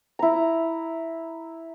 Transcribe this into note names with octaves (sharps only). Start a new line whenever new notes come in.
E4 A#5